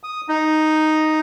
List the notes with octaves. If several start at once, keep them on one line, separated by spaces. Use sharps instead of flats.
D#6
D#4